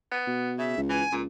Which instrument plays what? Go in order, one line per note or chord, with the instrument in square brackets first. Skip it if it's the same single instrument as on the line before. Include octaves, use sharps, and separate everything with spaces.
[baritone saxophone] B3
[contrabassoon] B2
[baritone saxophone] C#3 [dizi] E5
[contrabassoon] C#2
[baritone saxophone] E3 [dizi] G#5
[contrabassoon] C#2 [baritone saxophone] A#2